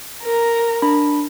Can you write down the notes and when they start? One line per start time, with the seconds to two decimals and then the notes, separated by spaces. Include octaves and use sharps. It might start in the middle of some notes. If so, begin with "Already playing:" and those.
0.22 A#4 A#5
0.82 D4 B5